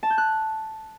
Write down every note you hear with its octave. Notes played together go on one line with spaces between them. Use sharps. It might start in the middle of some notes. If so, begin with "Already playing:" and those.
A5
G6
F#6